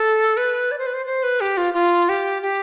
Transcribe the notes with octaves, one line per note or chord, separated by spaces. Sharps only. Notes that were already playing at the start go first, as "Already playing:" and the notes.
Already playing: A4
B4
D5
C5
B4
C5
C5
B4
G4
F4
F4
G4
G4